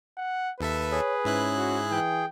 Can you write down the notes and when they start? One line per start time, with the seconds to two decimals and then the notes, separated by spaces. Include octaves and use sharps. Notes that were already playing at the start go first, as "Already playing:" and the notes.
0.17 F#5
0.61 D#2 A4 B4 E5
0.92 G#4 C#5
1.25 G#2 C#4 E4 F#6
1.57 F#4
1.91 E3 G5